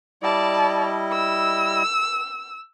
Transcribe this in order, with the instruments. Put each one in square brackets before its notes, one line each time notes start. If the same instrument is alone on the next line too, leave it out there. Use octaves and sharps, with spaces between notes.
[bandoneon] G3 E4 D#5 [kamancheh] D5 A5
[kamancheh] E6